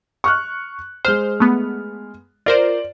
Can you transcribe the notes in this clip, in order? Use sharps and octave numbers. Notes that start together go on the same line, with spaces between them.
C#6 F6 F#6
G#3 C5 F6
A3 B3
F4 A#4 C5 D5